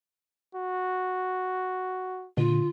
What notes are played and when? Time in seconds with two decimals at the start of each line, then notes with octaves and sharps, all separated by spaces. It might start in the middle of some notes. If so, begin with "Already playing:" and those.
0.55 F#4
2.37 A#2 D3 F4